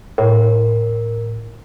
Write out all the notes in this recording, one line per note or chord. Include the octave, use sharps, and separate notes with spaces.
A2 A#4